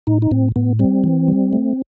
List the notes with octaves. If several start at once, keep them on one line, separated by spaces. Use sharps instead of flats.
A2 D#4
D#4
A2 C4
A2 B3
G3 C4
E3
G3
A3